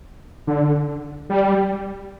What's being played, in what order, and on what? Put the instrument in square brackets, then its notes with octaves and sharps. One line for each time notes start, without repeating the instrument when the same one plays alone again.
[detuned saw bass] D3
G3